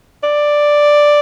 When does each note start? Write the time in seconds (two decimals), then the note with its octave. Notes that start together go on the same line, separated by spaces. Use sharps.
0.23 D5